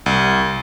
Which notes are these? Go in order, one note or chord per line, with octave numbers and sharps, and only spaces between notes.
C2